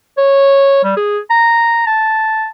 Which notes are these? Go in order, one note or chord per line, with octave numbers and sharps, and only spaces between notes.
C#5
G3
G#4
A#5
A5